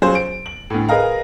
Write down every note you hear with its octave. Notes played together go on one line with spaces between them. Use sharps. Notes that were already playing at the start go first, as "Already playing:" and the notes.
F#3 C#4 F4 G#4 C5
D7
F#7
D2 A2
G#4 A#4 B4 D#5 F5 A#5